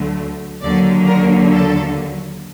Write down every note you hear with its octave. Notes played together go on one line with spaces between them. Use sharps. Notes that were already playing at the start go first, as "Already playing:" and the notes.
Already playing: D2 D3 F#3 A3
D#2 D3 F#3 A#3 D5
A#4
A4